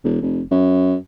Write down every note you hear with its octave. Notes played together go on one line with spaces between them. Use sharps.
E1
F1
F#2